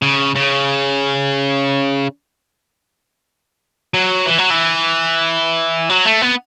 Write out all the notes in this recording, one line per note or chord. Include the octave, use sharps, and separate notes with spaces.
C#3
C#3
F#3
E3
F#3
E3
F#3
A3
B3